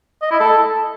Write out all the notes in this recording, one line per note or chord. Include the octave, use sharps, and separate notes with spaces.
D#5
E4
A4